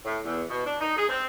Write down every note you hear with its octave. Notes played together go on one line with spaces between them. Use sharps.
A2
E2
B2
D4
D#4
G#4
C4